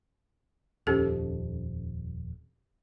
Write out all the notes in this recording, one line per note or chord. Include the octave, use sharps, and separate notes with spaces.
D#1 F2 C#4 G4 A4